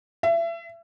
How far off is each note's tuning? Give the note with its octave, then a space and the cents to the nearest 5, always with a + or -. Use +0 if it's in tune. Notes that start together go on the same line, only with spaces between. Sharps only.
E5 +30